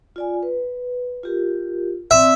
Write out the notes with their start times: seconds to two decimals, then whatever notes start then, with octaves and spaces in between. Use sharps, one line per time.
0.16 F4 D5 G#5
0.43 B4
1.23 F4 G4 A#4
2.11 C4 D5 E5